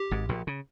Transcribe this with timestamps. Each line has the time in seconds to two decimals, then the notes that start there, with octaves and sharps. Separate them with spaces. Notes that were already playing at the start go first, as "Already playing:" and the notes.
Already playing: G4
0.11 G#1 G#2
0.29 A#1 A#2
0.47 C#3